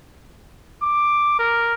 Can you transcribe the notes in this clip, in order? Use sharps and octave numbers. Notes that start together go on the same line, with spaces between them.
D6
A#4